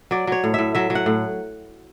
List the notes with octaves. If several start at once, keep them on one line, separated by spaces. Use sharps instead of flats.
F#3 D5
F#3 C#5
A2
A2 E5
F#3 E5
F#3
F#5
A2